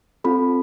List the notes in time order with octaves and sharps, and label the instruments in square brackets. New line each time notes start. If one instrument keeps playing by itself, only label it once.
[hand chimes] C4 F4 A4 B5